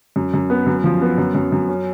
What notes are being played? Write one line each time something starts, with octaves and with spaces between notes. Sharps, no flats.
F#2
F#2
B3
F#2
F3
B3
F#2
F#2
F#2
C#4